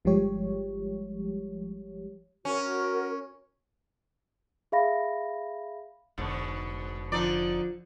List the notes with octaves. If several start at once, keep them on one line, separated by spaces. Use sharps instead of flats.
G1 F3 G3 G#3 G4 C#5
C#4 F#4 A#4
G#4 E5 F5 B5 A#6
F1 G#2 B2 D3
D3 F3 D#4 D5